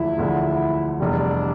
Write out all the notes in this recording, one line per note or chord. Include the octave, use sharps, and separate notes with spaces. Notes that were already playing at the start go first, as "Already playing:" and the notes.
Already playing: E1 D2 D3 F3 E4
E1 D2 D3 F3
F1 E2 C3 G3 D4